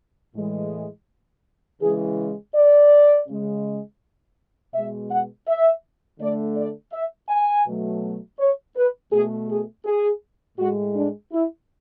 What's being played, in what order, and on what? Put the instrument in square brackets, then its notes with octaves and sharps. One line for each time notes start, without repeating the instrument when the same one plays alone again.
[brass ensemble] A2 E3 G#3
C#3 E3 G#3 G#4
D5
C#3 G#3
B2 G#3 E5
F#5
E5
D3 A3 D5
D5
E5
G#5
B2 F#3 A3
C#5
B4
B2 A3 G#4
G#4
G#4
A2 G#3 F#4
D4
E4